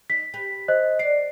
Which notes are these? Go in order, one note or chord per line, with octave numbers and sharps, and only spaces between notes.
D#4 B6
G4 B4
C5 D#5 F#6
D5 C7